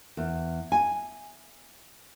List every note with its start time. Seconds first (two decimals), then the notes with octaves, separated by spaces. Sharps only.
0.17 E2
0.72 G#5